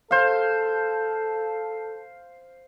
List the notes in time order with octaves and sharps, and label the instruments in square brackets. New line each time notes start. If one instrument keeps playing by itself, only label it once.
[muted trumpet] A4 [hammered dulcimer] C5 F5